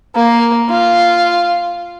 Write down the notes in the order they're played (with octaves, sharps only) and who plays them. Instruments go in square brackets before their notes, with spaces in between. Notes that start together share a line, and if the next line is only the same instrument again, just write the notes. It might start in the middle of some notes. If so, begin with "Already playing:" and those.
[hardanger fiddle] A#3
F4